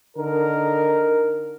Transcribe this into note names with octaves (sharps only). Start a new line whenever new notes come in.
D3 D#4 A#4